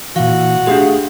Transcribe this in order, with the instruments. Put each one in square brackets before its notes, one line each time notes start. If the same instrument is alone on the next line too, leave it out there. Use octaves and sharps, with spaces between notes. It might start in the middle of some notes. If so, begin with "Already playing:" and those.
[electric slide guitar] A#2 E3 [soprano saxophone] F#4 [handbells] F5
[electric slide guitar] A3 G#4 F5 [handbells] D4 G4